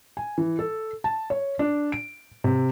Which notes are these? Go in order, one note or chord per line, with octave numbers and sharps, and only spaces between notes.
G#5
E3
A4
A5
C#5
D4
D7
C3